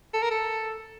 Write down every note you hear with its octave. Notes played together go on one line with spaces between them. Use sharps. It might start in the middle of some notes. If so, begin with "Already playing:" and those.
A4
A#4
A4